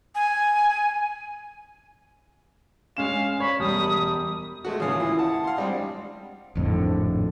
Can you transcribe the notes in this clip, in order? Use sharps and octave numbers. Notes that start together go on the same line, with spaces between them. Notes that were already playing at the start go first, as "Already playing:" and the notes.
G#5
G#3 C#4 F5 E7
C#5 B5
E1 G3 D#6
G#3 A3 F#4
D#2 C#3 E3 C#4 F4 F5 D#6
E4
F#5 A5
F5 C6
G3 G#3 C4 D4
G#1 F2 A2 D3